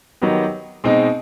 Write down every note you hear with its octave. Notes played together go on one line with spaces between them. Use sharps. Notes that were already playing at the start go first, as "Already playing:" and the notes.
D#3 F#3 B3 D#4 G4
B2 G#3 C4 D#4